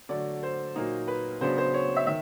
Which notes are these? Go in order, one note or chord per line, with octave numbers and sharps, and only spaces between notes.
D3 F#3 A3 D5
C5
A#2 F#3 A#3 D#4
B4
C#3 F#3 B3 D4 C5
C5
C#5
E5
D#3 E5